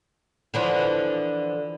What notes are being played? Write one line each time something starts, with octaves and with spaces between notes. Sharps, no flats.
D3 E3 F3